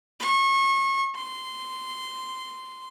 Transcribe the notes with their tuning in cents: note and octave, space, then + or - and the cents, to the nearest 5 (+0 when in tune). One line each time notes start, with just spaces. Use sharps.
C#6 -30
C6 -10